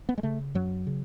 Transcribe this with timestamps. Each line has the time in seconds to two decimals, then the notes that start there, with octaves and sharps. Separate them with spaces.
0.09 B3
0.18 G#3
0.23 C#3 A3
0.55 F#2 F#3
0.87 C#3